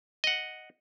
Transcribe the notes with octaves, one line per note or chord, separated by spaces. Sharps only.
D#5 F#5